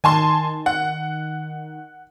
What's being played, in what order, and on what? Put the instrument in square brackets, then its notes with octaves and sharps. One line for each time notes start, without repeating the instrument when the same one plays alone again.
[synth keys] D#3 [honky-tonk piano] G#5 A5 C6
[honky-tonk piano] F#5